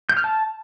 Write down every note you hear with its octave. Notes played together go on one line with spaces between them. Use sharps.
G6
F6
A5